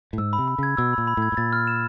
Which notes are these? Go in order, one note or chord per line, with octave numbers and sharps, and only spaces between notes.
A2
G#2 E6
B5
C3
B5
C#3 G#6
B2 E6
A#2 B5
B5
A2
G#6
A2
A#2 A6
F6
E7